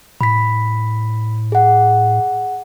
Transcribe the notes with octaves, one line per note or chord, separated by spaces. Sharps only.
A2 B5 B6
G#4 F#5